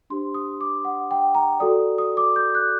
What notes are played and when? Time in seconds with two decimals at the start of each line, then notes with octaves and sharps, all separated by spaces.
0.10 D4 G4 C5 C6
0.34 D#6
0.61 D6
0.85 F#5
1.11 G5
1.35 A#5
1.60 F#4 A4 D5 D#6
1.98 D#6
2.17 D6
2.36 G6
2.55 F#6